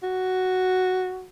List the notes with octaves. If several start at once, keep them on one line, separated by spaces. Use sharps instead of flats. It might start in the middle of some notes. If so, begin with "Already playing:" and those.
F#4